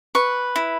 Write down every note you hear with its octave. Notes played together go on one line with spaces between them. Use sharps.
B4 C#6
E4